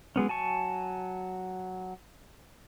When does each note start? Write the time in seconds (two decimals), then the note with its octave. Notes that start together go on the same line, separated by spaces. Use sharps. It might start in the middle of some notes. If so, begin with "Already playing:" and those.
0.16 F#3 G#3 B3 C#4
0.29 F#3 G#5 A5 C#6